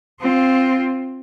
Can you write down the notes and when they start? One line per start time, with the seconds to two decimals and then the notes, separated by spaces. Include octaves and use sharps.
0.21 C4 F4